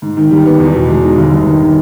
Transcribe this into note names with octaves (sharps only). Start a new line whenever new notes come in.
G#2
D#3
G3
B3
E2
B2
G#3
D#4
G1
G2
D#3